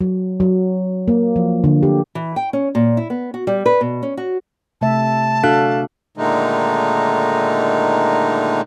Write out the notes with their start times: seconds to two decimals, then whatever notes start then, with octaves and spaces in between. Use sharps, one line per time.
0.01 F#3
0.40 F#3
1.08 A#3
1.36 F3
1.64 D3
1.83 G4
2.15 E3
2.36 G5
2.53 C#4
2.75 A#2
2.97 E4
3.10 B3
3.34 F#4
3.47 G3
3.66 B4
3.81 B2
4.03 C#4
4.17 F#4
4.81 C3 A3 E5 A5
5.43 D4 F#4 A4 F5 F#6
6.17 A#2 D3 D#3 G#3 A3 D#4